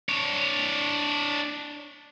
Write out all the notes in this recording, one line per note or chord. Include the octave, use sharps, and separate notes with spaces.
D4 C#5